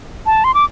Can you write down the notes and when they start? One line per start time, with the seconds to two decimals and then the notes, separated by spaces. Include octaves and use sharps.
0.26 A5
0.44 C6
0.54 D6